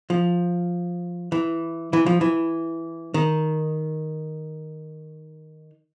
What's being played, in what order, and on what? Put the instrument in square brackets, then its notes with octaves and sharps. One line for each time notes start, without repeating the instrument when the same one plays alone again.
[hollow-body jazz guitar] F3
E3
E3
F3
E3
D#3